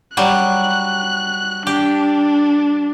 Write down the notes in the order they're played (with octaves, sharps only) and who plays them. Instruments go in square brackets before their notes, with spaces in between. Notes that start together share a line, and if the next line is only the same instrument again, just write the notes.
[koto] F#3 G3 [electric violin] F#6
[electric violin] D4 [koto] G4